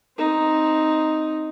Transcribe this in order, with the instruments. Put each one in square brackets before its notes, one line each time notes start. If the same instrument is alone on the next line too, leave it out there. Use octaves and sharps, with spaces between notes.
[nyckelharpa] C4 D#4